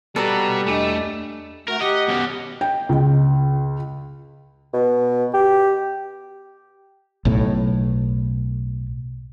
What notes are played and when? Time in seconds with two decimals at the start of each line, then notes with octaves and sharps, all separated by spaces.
0.16 G3 B3 F#4 A4 D5 A#5
0.66 E2 A3 D4 D#5
1.68 A3 F#4 A#4
1.81 G4 D#5 F#5
2.09 B2 C#4
2.61 G5
2.89 C#2
4.73 B2
5.34 G4
7.25 B1 A2